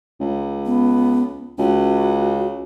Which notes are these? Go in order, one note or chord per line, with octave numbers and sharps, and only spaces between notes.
C#2
B3
C#2 F#4